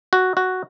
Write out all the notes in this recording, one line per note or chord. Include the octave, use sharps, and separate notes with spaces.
F#4
F#4